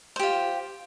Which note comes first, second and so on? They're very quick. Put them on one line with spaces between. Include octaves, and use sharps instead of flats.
C5 G4 F4